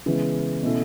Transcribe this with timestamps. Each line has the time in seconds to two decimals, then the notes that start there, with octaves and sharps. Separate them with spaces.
0.06 C#3 E3 G#3 B3
0.63 B2 A3 C#4 E4 A4